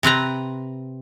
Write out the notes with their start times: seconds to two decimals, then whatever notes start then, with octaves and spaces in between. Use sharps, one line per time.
0.03 C3 C4 B4 A#5